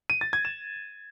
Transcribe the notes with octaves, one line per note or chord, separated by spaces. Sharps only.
D#7
A6
G#6
E7